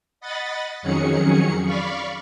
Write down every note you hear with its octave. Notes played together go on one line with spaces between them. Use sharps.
D#5 F#5 B5 A6
F2 D#3 F#3 C#4 G#4 C#7
D5 F5 B5 C#6